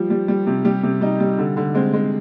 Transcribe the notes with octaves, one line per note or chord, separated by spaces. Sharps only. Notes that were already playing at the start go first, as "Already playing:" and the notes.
Already playing: F3 G3
G3
G3
C3
G3 G4
C3
G3 D#4
G3
D3
D3
G#3 C4
G#3